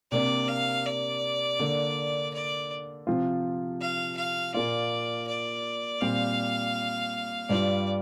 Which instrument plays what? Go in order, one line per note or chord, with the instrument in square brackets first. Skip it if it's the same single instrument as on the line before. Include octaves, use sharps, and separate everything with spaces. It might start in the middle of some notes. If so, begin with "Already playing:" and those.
[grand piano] C3 A#3 D4 [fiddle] D5
[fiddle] F5
D5
[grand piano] D3 A#3 D4
[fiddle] D5
[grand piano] C3 F3 C4 F4
[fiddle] F5
F5
[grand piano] A#2 A#3 F4 [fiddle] D5
[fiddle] D5
[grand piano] A#2 G3 C4 [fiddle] F5
[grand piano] G2 G3 D4 F4 [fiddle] D5